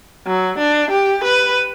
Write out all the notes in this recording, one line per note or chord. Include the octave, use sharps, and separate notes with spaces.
F#3
D4
G4
B4